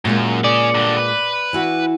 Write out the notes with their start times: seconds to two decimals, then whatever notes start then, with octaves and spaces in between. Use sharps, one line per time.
0.05 F#2 A#2 G#3 A#3
0.44 C#4 G#4 D5
0.75 G2 D3
0.97 B4
1.53 E3 E4 F#4